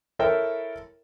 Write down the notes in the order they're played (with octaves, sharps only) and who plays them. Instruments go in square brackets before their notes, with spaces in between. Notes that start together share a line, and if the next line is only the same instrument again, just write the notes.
[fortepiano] E4 A4 A#4 C#5 E5 G5